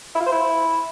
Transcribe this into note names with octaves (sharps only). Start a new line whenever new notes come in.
E4
F4
C5
E4